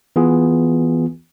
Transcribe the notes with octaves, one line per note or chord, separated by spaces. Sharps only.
E3 B3 F4 G#4